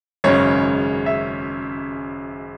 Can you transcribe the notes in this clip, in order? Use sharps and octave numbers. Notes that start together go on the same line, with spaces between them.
G#1 F#2 C#3 G#3 C#5
E5